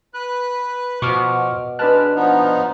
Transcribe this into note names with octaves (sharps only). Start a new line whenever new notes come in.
B4 F#6
B2 F3 C#6 D6 F6
G#3 D4 B4 A5 F6 F#6
F3 B3 D#4